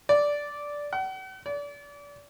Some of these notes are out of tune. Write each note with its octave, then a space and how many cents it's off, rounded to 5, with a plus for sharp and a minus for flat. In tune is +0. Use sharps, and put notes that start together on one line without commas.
D5 -5
F#5 +45
D5 -30